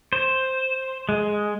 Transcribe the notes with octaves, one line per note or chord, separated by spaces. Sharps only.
C5
G#3